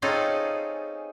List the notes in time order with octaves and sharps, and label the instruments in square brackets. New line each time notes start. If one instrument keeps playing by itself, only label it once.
[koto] C4 C#4 D#4 F4 G#4 A4